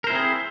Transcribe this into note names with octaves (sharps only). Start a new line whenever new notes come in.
C4 E4 G#4 A#4 C5